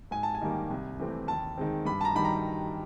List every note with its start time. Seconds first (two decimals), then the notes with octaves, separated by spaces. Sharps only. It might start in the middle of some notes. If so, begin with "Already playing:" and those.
0.11 G#2 G#5
0.23 A5
0.35 G#5
0.41 D#3 G3 A#3
0.70 C2
0.99 C3 E3 A3 C4
1.28 D#2 A5
1.57 D#3 G#3 C4
1.85 G2 B5
2.01 A5
2.05 A#5
2.15 D#3 G3 B5
2.25 A#5